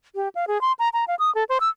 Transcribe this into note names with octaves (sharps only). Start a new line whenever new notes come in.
G4
F5
G#4
C6
A#5
A#5
F5
D#6
A4
C5
E6